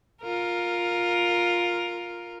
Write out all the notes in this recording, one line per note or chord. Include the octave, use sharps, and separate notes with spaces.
F4 A#4